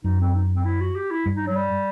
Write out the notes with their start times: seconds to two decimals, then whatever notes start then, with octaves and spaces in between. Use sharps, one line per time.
0.04 F#2 D#4
0.20 C4
0.35 D#4
0.56 C4
0.65 E4
0.81 F#4
0.96 G4
1.11 E4
1.26 G2
1.36 D#4
1.46 F#3
1.56 G3